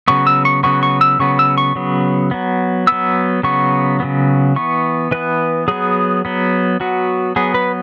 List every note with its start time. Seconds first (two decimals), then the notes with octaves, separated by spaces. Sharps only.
0.08 C#3 F#3 B3 C#6
0.27 E6
0.45 C#6
0.63 C#3 F#3 B3 C#6
0.83 C#6
1.01 E6
1.20 C#3 F#3 B3 C#6
1.39 E6
1.58 C#6
1.75 C#3 F#3 B3
2.31 F#3 B3
2.87 F#3 B3 E6
3.43 C#3 F#3 B3 C#6
4.00 C#3 F#3 B3
4.56 E3 B3 C#6
5.11 E3 B3 B4
5.68 F#3 B3 G#4
6.25 F#3 B3
6.80 F#3 B3 F#4
7.36 F#3 B3 G#4
7.54 B4